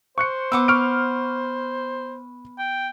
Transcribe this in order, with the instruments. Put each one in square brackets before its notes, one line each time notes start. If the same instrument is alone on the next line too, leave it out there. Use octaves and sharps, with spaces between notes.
[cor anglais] C5 [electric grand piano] C#6 F#6 C#7
[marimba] B3 [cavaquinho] B4 F#5 D6 [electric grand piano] E6
[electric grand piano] C#6 F6 D7
[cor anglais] G5